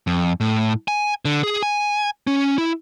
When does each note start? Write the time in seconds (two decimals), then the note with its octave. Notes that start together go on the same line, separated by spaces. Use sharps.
0.07 F2
0.41 A2
0.88 G#5
1.25 D3
1.43 G#4
1.63 G#5
2.27 C#4
2.58 E4